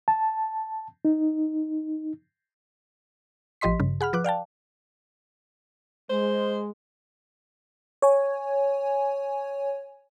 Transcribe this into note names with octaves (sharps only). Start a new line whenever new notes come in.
A5
D#4
A1 F3 G4 D#5 C6 B6
G2 C#3
G#4 F#5 B5 F6
F3 B4 D6 F#6
D5 F5 G5 A5
G#3 C5
C#5 G#5